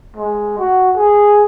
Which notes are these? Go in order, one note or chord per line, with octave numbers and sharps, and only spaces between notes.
G#3
F#4
G#4